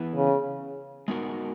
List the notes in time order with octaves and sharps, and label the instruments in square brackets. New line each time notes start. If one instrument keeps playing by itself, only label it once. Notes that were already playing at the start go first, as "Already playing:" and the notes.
Already playing: [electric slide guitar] E3 B3 E4 B4
[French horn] C#3
[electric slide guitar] G#3 B3 D#4 F#4 A#4